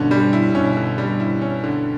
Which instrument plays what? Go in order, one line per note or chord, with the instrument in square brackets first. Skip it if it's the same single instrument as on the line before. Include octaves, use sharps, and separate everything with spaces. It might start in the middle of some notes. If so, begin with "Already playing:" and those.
Already playing: [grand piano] G2 B2 [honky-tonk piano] D3 C#4
[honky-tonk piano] G3
E4
[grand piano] G2 B2 [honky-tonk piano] C#4
[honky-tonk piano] D3
G3
E4
C#4
D3